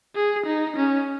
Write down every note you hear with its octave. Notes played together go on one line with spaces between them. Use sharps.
G#4
D#4
C#4